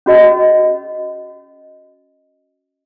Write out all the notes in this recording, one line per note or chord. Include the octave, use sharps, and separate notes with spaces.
C#4 F#4 D#5